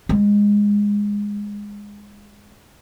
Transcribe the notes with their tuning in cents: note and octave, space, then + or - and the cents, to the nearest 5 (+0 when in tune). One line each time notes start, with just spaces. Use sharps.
G#3 -15